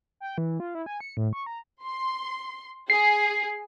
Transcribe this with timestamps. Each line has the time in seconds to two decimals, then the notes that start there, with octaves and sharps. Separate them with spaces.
0.20 G5
0.38 E3
0.60 F4
0.75 E4
0.86 G#5
1.01 C#7
1.17 A2
1.33 C#6
1.46 A#5
1.84 C6
2.90 G#4 C7